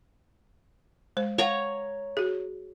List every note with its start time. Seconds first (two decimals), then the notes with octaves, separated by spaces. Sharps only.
1.17 G#3 C5
1.38 C#5 F5 F#5 A#5
2.17 F#4 G#4